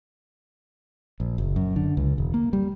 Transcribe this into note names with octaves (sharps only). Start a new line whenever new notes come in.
A#1
F#1
F#2
D3
C#2
E1
A#3
G3